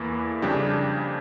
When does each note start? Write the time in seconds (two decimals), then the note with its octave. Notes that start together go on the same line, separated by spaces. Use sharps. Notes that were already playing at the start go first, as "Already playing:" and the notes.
Already playing: E2 E3 A#3 E4 A4
0.42 F2 C#3 G3 D4 G4